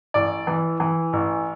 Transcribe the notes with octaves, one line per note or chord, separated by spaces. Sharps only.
A1 D5
E3
E3
A1